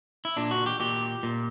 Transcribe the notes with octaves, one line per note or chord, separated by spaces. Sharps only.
E4
A#2 D4
F#4
G4
A#2 G4
A#2